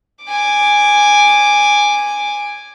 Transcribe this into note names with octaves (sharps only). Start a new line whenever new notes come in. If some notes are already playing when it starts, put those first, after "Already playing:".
G#5 D6